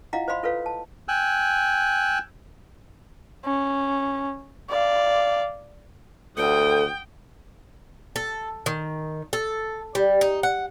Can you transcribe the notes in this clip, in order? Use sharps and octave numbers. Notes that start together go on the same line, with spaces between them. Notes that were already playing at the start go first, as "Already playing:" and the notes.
E4 F4 D#5 F5 F#5 A#5
C5 D#5 F5 B5 C6
F4 A4 B4 C#5 F5
A5
G5 G#5 E6 F#6
C#4
D5 F5
D2 A4 F#5 G5 D#6
A4
D#3
A4
G3
D#4
F#5